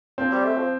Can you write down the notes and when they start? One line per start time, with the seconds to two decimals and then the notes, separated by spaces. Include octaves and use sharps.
0.18 F3 C4
0.31 G3
0.45 A3
0.57 F3